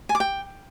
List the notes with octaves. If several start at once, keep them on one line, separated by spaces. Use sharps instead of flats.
G#5
D6
G5